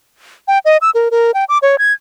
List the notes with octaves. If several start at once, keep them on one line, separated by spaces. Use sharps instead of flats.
G5
D#5
E6
A#4
A#4
G5
D6
C#5
G#6